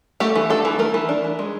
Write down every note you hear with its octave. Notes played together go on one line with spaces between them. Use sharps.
A3 G4
E3
D4 A4
E3
A3 A#4
E3
D4
E3
G#3